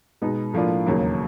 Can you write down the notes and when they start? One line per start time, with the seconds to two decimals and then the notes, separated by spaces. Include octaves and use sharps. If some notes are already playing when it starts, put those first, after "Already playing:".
0.22 B2 G#3 B3 D#4
0.53 A2 F3 A#3 D4 F4
0.86 E1 D#2 C#3 F#3 A#3